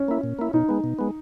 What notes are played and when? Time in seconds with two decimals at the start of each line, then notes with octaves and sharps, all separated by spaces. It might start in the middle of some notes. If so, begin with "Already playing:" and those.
Already playing: C#4
0.08 A#3 E4
0.23 A#2
0.39 A#3 E4
0.53 B2 D#4
0.69 G#3 B3
0.84 B2
0.99 G#3 B3